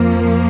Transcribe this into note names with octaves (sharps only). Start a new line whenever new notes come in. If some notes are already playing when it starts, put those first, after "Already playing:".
Already playing: F2 F3 A#3